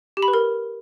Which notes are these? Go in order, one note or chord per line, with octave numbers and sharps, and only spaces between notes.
G4
B5
B4
A#4